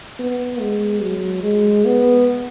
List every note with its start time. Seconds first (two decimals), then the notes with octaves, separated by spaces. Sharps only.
0.20 B3
0.61 G#3
1.02 F#3
1.43 G#3
1.85 B3